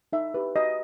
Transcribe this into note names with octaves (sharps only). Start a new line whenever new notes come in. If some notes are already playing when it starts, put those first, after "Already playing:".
D#4 E5
G4 B4
F#4 D#5